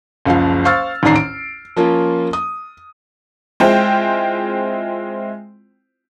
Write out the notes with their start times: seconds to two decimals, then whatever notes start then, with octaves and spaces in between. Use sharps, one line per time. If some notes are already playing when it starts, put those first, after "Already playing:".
0.26 F#1 C#2 F3 F5
0.65 C5 F5 C#6 E6 F6 A6
1.03 A1 D#2 G#2 D4 A#5 C7
1.16 D7
1.77 F3 A#3 C#4 F4
2.33 D#6
3.60 G#3 C4 E4 F4 C5 G5